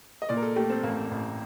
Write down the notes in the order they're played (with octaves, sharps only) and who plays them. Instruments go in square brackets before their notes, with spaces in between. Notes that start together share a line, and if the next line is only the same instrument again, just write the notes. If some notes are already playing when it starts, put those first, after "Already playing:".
[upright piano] D#5
[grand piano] A#2 [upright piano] D5
[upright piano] A#4
A4
[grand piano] A3 [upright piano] G4
[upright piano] C4
[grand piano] A1 [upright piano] A#3
[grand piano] A1